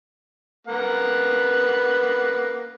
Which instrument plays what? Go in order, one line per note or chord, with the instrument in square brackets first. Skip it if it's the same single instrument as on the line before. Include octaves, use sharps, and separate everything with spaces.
[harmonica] A#3 B4 F#5